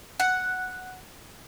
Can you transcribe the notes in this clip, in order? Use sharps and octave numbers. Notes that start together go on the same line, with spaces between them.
F#5